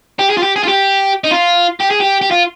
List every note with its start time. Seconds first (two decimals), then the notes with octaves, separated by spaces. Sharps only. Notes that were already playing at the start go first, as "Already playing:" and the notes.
0.19 G4
0.30 G#4
0.37 F4
0.43 G4
0.56 G#4
0.63 F4
0.68 G4
1.24 D#4
1.31 F4
1.81 G4
1.91 G#4
2.01 G4
2.21 G4
2.31 F4